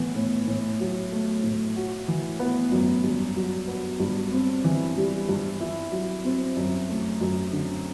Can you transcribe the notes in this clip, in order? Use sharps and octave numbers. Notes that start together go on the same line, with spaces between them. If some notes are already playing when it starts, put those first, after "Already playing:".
Already playing: A2 E3 B3
A2
A2
F#3
A3
A2
F#4
E3
B3
F#2
G2
F#3
B3
G2
C4
E3
G3
G2
E4
F#3
C4
F#2
A3
F#2
D3